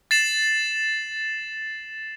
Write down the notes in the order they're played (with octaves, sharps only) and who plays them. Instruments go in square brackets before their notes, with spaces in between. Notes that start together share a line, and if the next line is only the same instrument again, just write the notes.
[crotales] A6 C7 E7 F#7